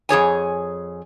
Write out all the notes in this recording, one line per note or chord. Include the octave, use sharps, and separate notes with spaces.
F2 G#4 C#5 G#5